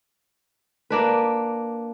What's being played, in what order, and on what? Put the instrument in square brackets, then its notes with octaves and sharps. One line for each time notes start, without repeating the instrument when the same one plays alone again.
[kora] A#3 D4 B4